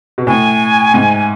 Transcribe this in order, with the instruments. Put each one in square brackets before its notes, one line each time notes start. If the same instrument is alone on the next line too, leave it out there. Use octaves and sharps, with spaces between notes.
[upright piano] B2
[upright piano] A2 [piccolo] G#5
[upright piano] G#2